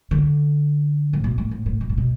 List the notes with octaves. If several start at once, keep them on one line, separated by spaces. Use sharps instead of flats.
D3
A2
B2
A2
A2
A2
B2
A2
B2